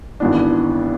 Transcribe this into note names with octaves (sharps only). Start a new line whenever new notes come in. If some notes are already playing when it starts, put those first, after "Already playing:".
G#1 G#2 E3 B3 D4